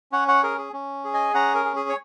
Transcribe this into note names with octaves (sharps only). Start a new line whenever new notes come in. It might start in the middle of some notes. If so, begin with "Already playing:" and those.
C#4 C#5 F#5
C#5 F#5
G#4 A#4
G#4
C#4
G#4
D#5 G#5
C#4 F#5 A#5
A#4
G#4
G#4
C#5